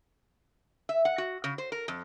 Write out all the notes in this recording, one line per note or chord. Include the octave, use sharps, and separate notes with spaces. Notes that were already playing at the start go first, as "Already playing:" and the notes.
E5
F#5
F#4
C#3
C5
A#4
F2